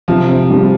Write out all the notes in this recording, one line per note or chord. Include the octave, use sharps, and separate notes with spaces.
C3 F3
C3
G3